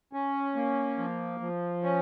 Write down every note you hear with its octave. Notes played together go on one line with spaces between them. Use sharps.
C#4
A#3
F3
F3
C#4